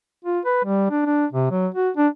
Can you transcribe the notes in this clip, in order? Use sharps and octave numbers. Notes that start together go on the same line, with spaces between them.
F4
B4
G3
D4
D4
C3
F#3
F#4
D4